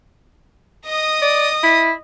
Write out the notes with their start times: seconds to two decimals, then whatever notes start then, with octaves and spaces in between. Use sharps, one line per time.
0.86 D#5 D#6
1.22 D5
1.63 E4